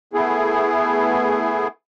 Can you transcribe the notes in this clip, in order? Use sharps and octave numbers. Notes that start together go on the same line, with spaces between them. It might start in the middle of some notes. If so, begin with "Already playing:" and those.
A3 B3 E4 G#4